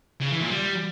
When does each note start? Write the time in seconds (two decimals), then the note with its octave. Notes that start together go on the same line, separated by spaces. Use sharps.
0.21 C#3
0.31 E3
0.41 A#2
0.51 G3